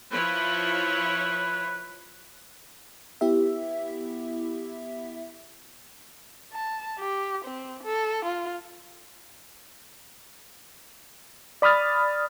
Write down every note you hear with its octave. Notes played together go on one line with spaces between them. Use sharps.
F3 E4 B4 C#5
B3 E4 G4 E5
A5
G4
C4
A4
F4
D5 B5 D#6 F6 A6